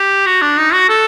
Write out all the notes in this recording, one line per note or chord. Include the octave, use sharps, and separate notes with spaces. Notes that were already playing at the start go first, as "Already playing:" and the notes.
Already playing: G4
F#4
D4
D#4
F#4
A4